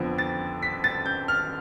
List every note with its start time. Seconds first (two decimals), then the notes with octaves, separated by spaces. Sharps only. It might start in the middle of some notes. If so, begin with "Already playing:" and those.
Already playing: F2 D3 F3 B3
0.18 A6
0.62 B6
0.84 A6
1.06 G6
1.28 F6